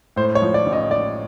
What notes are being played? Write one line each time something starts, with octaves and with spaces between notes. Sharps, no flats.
A2 C5
C#5
F3
D5
A1
D#5
A1 D5